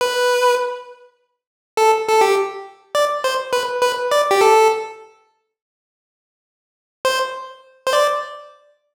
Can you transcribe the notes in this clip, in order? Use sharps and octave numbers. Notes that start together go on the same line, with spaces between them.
B4
A4
A4
G4
D5
C5
B4
B4
D5
G4
A4
C5
C5
D5